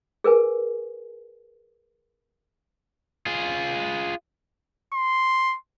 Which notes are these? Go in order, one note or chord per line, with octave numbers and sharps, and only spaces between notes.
G#4 A#4 B4 G#5
F4 G#4
C6